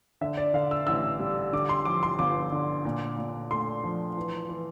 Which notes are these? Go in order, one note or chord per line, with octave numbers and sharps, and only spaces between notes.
D3 E5
D5
D3 F5
E6
A1 E6
G3
D3 D6
C6
F3 D6
C6
G1 D6
D3
A#2
A#2
A3 C6
F3
E3
E3